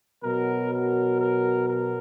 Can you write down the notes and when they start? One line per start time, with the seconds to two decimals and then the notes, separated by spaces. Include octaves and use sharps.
0.23 B2 F#3 A#4
0.72 A#4
1.20 A#4
1.69 A#4